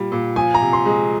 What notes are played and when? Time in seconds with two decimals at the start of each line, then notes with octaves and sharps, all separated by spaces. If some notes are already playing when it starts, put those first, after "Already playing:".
Already playing: A#2 G3
0.12 A#2
0.36 F3 G#5
0.54 A#5
0.61 C3
0.73 C6
0.86 G#3